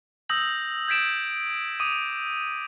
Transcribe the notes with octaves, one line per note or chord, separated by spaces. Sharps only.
D#6 E6 G6 A#6 F#7
G6 G#6 B6 D7 E7
D6 D#6 D#7